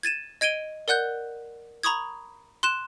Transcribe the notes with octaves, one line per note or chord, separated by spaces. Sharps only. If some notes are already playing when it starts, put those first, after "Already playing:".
G#6 A6 D#7 E7
D#5 G#6 D7 D#7 G7
A#4 D5 F#5 F#6 G6
A#5 B5 C#6 D#6 G#6
C6 F#6 E7